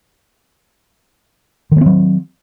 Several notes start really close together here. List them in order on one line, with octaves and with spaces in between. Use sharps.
D#3 A3 C4 F#3